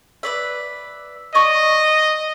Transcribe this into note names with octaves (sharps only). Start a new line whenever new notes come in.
B4 D5 E5
D5 D#5 C#6 D6